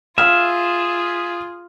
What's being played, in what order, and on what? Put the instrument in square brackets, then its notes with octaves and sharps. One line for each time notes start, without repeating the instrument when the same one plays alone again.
[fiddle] F4 [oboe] G#4 [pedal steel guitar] E5 [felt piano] F5 F6